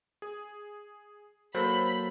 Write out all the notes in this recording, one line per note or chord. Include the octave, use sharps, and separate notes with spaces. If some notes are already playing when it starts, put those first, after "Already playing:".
G#4
F#3 A#3 A4 C5 B5